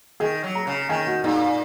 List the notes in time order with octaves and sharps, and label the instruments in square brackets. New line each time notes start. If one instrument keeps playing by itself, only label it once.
[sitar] D#3 [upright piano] G#4
[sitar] F#3
[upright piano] A#5
[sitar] C#3
[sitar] D#3 [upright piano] G#5
[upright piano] F#4
[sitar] A#2 [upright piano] D#4